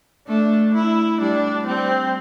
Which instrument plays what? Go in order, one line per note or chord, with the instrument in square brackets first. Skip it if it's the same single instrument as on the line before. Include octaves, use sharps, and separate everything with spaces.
[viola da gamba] A3 [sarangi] D4
[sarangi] E4
[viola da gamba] G3 [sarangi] D4
[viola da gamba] G3 [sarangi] C4